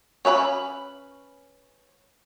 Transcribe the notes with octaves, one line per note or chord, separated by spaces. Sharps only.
C#4 B4 E5 B5